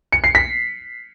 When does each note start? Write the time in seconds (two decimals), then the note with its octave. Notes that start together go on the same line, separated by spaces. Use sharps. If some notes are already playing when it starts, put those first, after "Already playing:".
0.12 C#7
0.24 C7
0.35 B6